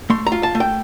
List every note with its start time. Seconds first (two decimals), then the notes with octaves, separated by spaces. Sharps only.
0.10 A3 C6
0.27 A#5
0.32 F4
0.43 A5
0.55 A3
0.60 G5